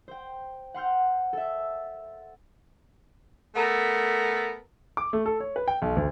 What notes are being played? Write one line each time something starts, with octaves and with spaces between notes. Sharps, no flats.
C5 G5
F#5 C6 F6 G6
A4 E5
A3 B3 A4 A#4
D6
A3
A4
C#5
B4
G5
B1
D2